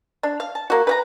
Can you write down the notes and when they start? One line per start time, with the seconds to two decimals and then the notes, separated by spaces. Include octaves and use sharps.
0.23 D4
0.40 F5
0.55 A5
0.70 A#3 F#4
0.87 B4 F#5 A#5